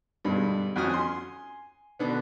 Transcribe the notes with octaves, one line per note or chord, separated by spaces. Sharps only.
G2 B2 D3 G#3
F2 C#4 F#4 D#6 F6
G#5 C6
B2 D3 B3